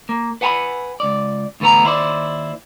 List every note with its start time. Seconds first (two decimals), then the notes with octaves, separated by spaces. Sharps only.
0.09 A#3
0.41 B4 F#5 G#5 A#5 B5
1.00 C#2 D5
1.60 D2 A2 E3 B3 A#5
1.84 D#2 E4 C5 D5